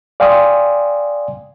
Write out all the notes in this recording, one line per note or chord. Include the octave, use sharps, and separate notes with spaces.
D5 F5 G5 G#5 C6 D#6